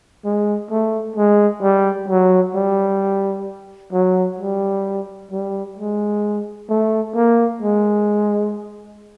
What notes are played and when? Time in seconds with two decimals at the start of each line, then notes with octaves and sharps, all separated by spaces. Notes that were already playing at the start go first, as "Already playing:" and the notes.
0.24 G#3
0.70 A3
1.16 G#3
1.62 G3
2.08 F#3
2.55 G3
3.93 F#3
4.39 G3
5.31 G3
5.77 G#3
6.69 A3
7.15 A#3
7.61 G#3